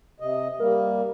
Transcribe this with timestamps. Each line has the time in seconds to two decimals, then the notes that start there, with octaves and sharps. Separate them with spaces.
0.20 C3 D#5
0.60 G3 A#3 A#4